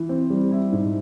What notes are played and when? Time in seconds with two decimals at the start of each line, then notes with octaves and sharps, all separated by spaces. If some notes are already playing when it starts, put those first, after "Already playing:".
Already playing: E3
0.09 C4
0.30 G3
0.51 E4
0.72 G#2